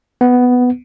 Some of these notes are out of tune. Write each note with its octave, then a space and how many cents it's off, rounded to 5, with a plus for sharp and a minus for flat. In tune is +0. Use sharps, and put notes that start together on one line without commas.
B3 +5